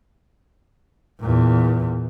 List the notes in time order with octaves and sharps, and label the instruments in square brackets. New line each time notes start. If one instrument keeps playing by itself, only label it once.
[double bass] E2 A#2